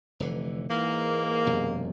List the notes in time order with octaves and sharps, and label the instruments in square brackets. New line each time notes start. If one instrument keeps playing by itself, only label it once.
[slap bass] F1 D3 E3
[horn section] G#2 A#3 [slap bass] E3
[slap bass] E1 F#2 C3